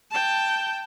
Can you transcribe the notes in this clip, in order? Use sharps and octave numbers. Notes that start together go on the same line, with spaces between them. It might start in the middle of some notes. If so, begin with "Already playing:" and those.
G5 A5